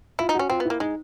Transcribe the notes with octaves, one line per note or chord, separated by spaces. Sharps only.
E4 F4
D#4
C#4 F#4
C4 F4
B3
A#3 E4
G#3 D#4